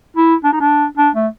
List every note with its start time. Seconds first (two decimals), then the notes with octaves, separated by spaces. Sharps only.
0.16 E4
0.44 D4
0.52 D#4
0.60 D4
0.97 D4
1.15 A3